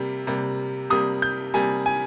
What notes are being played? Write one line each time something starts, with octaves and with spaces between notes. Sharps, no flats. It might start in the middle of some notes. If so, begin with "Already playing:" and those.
Already playing: C3 G3 A#3
C3 G3 A#3
C3 G3 A#3 D#6
G6
C3 G3 A#3 G#5
G#5